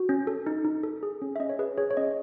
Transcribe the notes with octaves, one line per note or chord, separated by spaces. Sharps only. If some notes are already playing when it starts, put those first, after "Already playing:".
Already playing: F#4
C#4
A4
D#4
D#4
A4
G#4
C#4
E5
C#4 D#5
C#5
G#4 B4
G#4 C#5
C#5
C#4 D#5